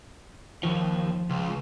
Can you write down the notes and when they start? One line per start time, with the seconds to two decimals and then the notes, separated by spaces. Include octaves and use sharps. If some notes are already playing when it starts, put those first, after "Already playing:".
0.63 D#2 F3
1.30 C#2